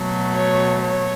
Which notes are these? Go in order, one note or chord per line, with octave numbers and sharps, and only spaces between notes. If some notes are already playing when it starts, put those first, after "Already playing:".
Already playing: B2 F#3 A3
C#5
C#5